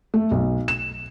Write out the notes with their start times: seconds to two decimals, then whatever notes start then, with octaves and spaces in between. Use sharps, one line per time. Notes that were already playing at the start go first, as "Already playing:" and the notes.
0.14 A3
0.31 B1
0.68 E7